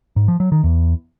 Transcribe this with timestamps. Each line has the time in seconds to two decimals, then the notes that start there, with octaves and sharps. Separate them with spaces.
0.16 G#2
0.28 F3
0.40 F#3
0.52 D#3
0.64 E2